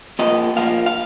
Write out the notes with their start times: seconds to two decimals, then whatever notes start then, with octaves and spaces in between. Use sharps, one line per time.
0.19 A#2 F3 A#3 D#5
0.56 A#2 F3 A#3 F5
0.86 F5